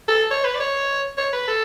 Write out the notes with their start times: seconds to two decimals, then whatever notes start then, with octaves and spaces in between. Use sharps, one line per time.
0.08 A4
0.31 C#5
0.44 B4
0.54 D5
0.60 C#5
1.18 C#5
1.33 B4
1.48 A4